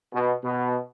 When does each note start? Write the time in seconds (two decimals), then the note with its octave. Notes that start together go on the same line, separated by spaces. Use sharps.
0.13 B2
0.44 B2